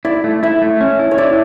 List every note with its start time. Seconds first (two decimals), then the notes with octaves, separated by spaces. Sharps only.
0.05 E4 D5
0.24 A3
0.43 E4 E5
0.62 A3
0.81 C#4
0.99 E4
1.11 C#5
1.18 E4 D5